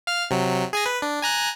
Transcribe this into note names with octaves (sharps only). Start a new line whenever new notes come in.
F5 F6
C3 F#3
G#4 G#5 A#6
B4
D4
G#5 A#5 F#6